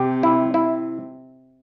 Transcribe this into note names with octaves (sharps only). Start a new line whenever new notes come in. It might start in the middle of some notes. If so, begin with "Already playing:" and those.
Already playing: C3 G4
E4
E4